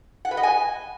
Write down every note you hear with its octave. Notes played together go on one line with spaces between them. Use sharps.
F#5
B4
D#5
G#5